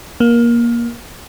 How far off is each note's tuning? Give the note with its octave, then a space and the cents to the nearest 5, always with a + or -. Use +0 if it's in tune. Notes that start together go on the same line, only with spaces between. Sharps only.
A#3 +20